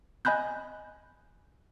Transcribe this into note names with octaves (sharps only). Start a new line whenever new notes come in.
D#5 G#5 B5 F#6 G6